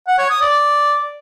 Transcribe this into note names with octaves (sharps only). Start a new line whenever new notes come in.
F#5
C#5
D#6
D5